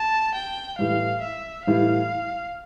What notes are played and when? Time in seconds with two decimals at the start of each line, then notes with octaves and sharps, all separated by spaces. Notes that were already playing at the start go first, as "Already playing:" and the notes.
Already playing: A5
0.35 G5
0.79 A2 E3 G3 F5
1.23 E5
1.67 A2 E3 G3 F5